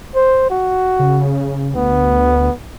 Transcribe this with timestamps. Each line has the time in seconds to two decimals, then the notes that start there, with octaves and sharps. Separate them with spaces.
0.15 C5
0.50 F#4
0.99 C#3
1.75 D2 B3